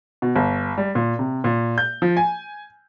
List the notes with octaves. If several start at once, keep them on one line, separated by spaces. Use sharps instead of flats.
B2
G1
G3
A#2
C3
A#2
G6
F3
G#5